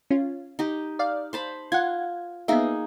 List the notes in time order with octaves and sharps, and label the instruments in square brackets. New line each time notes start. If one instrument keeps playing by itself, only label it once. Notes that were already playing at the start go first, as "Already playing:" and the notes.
[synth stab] C#4 F4
[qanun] D#4 G4
[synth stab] D5 F5
[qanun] C5 A5 B5
[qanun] F4 [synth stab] F#5 G#6
[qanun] A#3 D#4 G#4 [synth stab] B3 E5